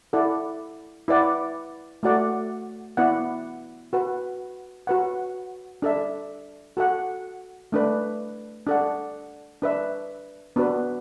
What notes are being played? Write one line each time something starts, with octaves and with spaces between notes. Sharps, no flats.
E4 A4 D5 F#5
E4 B4 D5 F#5
A3 F#4 D5 F#5
B3 E4 D5 F#5
F#4 B4 F#5
F#4 B4 F#5
D4 A4 E5
F#4 A4 F#5
A3 D4 B4
D4 A4 F#5
D4 B4 E5
B3 D4 F#4 B4